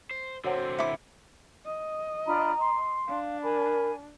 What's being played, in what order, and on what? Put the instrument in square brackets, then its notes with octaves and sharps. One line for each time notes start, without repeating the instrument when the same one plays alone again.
[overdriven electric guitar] C5
[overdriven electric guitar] D3 C4 [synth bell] F#4 C#5 F#5 [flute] C5
[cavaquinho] E4 D6 [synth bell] C#7
[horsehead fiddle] D#5
[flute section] D4 F4 B5 [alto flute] A#5
[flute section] C6
[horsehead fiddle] D4 [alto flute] F5
[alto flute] A#4 [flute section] G#5 B5